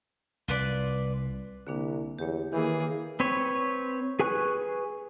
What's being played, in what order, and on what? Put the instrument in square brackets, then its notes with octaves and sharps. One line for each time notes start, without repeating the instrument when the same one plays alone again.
[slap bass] C2 [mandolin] F4 B4 D5
[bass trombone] C2 [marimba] D3 A#3 D4
[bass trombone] E2 [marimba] G4 C#5
[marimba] D#3 [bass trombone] E3 [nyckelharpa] A#3 G#4
[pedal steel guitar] C4 B4 C#5
G#4 B4 G#5 C#6 F#6